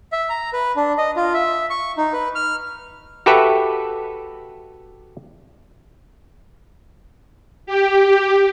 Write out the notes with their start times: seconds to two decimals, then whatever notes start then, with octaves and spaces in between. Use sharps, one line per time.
0.12 E5
0.29 A#5
0.53 B4
0.76 D4
0.98 D#5
1.16 F4
1.34 E5
1.70 C#6
1.97 D#4
2.13 B4
2.35 F6
3.26 F#4 G4 A4 B4 E5
7.66 G4